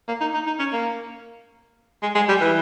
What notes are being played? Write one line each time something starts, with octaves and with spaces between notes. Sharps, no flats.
A#3
D#4
D#4
D#4
C#4
A#3
G#3
G#3
G3
E3